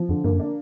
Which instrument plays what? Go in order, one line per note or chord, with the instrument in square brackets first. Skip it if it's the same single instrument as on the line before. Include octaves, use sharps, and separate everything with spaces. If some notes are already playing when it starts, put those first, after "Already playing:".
Already playing: [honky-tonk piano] F3
[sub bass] F2 [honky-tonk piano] D3
[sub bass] G2 [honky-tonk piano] A#3
[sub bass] F#2
[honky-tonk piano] D4